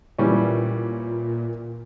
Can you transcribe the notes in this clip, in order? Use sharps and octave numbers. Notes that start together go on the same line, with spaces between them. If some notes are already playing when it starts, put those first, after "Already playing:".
A#2 E3 G3 C#4